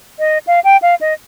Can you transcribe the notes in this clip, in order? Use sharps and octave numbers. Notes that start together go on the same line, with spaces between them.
D#5
F5
G5
F5
D#5